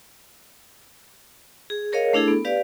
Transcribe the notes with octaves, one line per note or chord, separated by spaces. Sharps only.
G#4
G#4 A#4 C#5 D#5 F5
A3 D4 E4 G#4 A4
B3
G4 B4 D5 F5